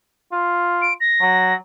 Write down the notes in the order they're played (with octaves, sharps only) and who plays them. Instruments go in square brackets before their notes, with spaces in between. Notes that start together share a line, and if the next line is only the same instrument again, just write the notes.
[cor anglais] F4
[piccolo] D7
A#6
[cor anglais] F#3